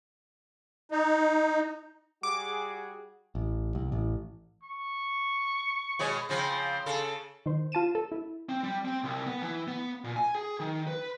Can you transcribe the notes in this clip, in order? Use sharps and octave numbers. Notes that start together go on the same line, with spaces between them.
D#4
G3 F#4 G#4 D6
A1
C2
A1
C#6
B2 G#3 C#5
C#3 F3 C4 C6
C#3 A4
D#3 C5
F4 A5 D#7 E7
A4
E4
C4
G3
C4
C2
B3
E3
B3
A#2
G#5
G#4
D#3
B4